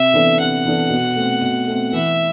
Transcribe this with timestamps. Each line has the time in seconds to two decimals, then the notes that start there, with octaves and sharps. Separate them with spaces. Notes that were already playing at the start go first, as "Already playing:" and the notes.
Already playing: C3 E5
0.14 E3 B3 D4 A4
0.39 C3 F#5
0.65 E3 B3 D4 A4
0.90 B2
1.16 A3 C4
1.41 B2
1.67 A3 C4
1.93 E3 E5